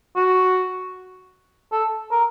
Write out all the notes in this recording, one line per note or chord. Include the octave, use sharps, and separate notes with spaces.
F#4
A4
A#4